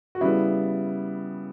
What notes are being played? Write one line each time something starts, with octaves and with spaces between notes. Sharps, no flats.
F#4
C#3 G3 B3 E4